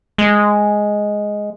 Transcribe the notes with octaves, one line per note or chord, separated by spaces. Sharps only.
G#3